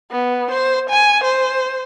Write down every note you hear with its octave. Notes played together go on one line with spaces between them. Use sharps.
B3
C5
G#5
C5